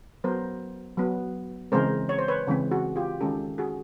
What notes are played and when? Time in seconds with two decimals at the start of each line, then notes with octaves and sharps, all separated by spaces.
0.24 F#3 B3 A#4 C5
0.98 F#3 B3
1.72 C#3 E3 G#3 C4 A#4 C5
2.09 C#5
2.18 C5
2.28 B4 C#5
2.47 C#3 E3 G#3 C4
2.71 F#4 G#4
2.96 F4 G4
3.21 D#3 G#3 C#4 G4 A4
3.58 F#4 G#4